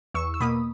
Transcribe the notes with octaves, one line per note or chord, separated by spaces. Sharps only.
E2 C#6 E6
E6
B2 A#3 B5 D#6